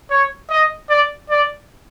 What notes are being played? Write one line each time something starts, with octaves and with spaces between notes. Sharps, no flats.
C#5
D#5
D5
D5